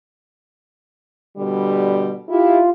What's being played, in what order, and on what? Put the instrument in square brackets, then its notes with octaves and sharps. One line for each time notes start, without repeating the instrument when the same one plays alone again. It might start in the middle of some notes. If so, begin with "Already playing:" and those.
[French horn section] B2 D3 G3
[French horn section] E4 G4 [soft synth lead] F4